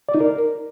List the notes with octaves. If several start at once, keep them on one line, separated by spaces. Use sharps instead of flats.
D5
D#4
A#4